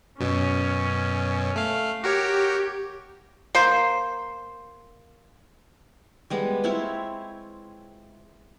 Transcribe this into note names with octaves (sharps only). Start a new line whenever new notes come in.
F#2 B2 C#4
A3 F5
F#4 G4 A#4 C#5
A#3 C5
G3 G#3 B3
C4 E4 F4 C#5